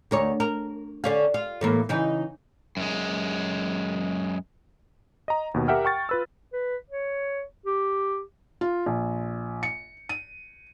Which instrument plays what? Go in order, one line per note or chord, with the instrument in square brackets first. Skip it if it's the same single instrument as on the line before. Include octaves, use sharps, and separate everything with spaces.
[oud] D2 A#4 C#5
A#4
D3 C#4 F5
F4
A2 E3 A#3
C#3 E3 D#4
[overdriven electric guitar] F#2 G#3
[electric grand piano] D#5 A#5
D#2 B2
G4 A#4 E5 F#5 G5 F6
G5 C#6 A6
F4 B4 E6
[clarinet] B4
C#5
G4
[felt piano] F4
A#1
C#7
D#7